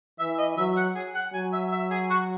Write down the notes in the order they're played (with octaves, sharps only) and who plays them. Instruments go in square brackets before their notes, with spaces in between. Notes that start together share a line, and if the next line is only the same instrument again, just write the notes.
[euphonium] E3 [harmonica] E5
[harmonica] D#5
[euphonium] F#3 [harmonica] E5
[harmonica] F#5
G#4
F#5
[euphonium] F#3 [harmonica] G#5
[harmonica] E5
E5
G#4
F#4